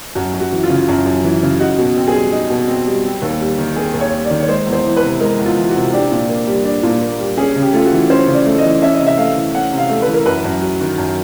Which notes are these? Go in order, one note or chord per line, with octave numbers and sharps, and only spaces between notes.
F#2 F#4
F#2
F#4
E3
F4
C#3
F#2
F#2
E3
C#3
D#4 F#4
B2
C4
G#4
G3
D#4
B2
C4
G3
C4
D#2
G3
D#3
C4 G#4
D#2
C#5
G3
D5
D#3
C#5
G#3 C5
E2
C5
E3
B4
C3
G#3 A#4
E2
F4
E3
F#4
C3
D4 G4
A#2
A#3
G3
D4
A#2
A#3
G3
C#4 G#4
C#3
G4
A3 F4
F#4
E3
C#4 C5
C#3
D5
A3
D#5
E3
C#4 E5
D#5
C3
E5
A3 F5
E3
C#4 F#5
C3
F5
A3
B4
E3
A#4
F#2 B4
F#2
F#3
D#3
F#2